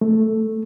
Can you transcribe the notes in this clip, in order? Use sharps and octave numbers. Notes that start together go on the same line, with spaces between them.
A3